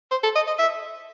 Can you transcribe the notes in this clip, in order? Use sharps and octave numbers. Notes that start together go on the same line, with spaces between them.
C5
A4
D#5
D#5
E5